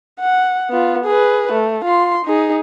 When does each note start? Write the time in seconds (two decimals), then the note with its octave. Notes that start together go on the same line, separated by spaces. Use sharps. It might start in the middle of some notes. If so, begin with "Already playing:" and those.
0.20 F#5
0.70 B3 F4
1.05 G#4 B4
1.52 A3
1.84 F4 C6
2.25 D#4 G#4